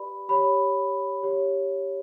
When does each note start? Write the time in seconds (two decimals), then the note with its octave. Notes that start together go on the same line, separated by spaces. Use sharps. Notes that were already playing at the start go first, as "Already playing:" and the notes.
Already playing: G4 B4 D5 B5
0.29 G4 C#5 B5
1.23 G4 C#5